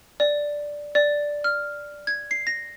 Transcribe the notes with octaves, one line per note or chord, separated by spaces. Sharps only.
D5
D5
F6
G#6
C7
A#6